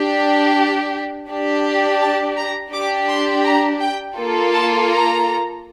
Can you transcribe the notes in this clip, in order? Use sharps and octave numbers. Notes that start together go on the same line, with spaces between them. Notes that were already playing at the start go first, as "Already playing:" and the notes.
Already playing: D4 G4
D4 G4
A5
A#5
D4 G4 D6
C6
A#5
G5
A#3 F4 A4
A5
A#5